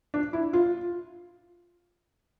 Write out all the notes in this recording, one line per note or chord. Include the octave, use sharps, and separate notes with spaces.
D4
E4
F4